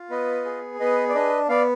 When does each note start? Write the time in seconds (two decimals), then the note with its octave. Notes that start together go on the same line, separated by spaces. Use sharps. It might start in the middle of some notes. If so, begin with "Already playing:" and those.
Already playing: F4
0.10 B3 B4 D#5
0.45 G#4
0.80 B3 B4 D#5
1.09 D5
1.14 D4 B4 D#5
1.49 B3 D5 F5